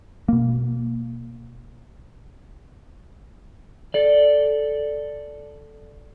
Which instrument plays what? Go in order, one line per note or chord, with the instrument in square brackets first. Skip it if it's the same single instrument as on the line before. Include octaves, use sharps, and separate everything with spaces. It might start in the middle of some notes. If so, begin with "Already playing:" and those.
[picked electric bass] B2 A#3
[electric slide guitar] A4 D5